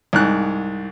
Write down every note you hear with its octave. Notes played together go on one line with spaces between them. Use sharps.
C2 G#2 F#6